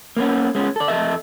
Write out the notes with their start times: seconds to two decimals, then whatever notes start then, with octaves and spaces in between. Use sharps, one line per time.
0.17 A#3 B3 C#4
0.55 G#3 B3 C#4
0.76 A4 D5
0.88 F2 A4 D#5 E5